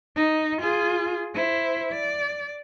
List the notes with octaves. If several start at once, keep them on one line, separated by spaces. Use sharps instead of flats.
D#4
F4 G#4
E4 C5
D5